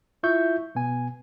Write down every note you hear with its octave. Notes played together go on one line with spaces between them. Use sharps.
E4 F4 E5 C#6 G6
B2 B3 G#5